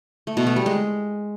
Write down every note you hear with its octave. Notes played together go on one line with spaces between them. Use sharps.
A3
B2
A3
G3
G#3